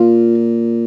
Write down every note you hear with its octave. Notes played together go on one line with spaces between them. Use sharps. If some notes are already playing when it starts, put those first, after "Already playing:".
Already playing: A#2 F4